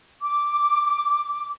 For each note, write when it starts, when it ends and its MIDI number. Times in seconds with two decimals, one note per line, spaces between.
0.21 1.51 86